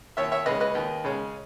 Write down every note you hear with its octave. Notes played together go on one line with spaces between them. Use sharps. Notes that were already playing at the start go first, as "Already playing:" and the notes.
D#2 C#5 E5
C#5 E5
C#3 G#3 C#4 B4 D#5
B4 D#5
D#2
C#3 G#3 C#4